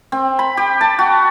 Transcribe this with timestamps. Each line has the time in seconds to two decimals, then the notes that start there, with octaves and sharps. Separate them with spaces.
0.12 C4
0.39 B5
0.57 G4
0.81 A5
0.99 F#4